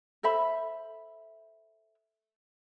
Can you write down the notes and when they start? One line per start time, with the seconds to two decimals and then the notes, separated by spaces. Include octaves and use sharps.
0.23 A4 C5 E5 B5